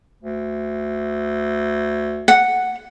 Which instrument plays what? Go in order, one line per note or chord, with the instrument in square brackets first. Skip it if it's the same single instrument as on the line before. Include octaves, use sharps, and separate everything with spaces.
[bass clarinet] D2
[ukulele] F#5